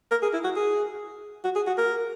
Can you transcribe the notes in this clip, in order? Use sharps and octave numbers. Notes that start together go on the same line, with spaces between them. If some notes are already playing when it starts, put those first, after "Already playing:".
A#4
G#4
E4
F#4
G#4
F#4
G#4
F#4
A#4